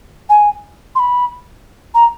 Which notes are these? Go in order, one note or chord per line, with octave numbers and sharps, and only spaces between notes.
G#5
C6
B5
A#5